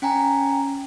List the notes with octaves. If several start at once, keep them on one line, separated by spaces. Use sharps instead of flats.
C#4 G5 G#5 A#5